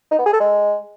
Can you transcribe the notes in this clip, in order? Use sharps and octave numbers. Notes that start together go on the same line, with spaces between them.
D#4
B3
G#4
A4
G#3